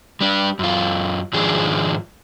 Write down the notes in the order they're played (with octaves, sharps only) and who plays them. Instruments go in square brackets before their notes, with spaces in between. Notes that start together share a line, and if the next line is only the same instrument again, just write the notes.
[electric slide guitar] G3 D4
F#2 F4
G#2 D#3 F3 D4 G#4